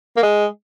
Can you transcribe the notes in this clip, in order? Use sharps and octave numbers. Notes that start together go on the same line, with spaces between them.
A#3
G#3